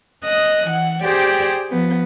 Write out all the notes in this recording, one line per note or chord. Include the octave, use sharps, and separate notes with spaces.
D#5 D#6 F#6
E3 F#5
G4 G#4 C5 D5 G5
F3 B3